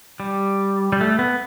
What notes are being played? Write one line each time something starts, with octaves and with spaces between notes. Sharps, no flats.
G3
G3
A3
B3